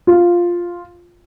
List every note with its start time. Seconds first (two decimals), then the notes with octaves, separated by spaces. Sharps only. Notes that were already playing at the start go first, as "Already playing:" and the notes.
0.07 F4